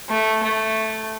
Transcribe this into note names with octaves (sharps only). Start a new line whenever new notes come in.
A3
A3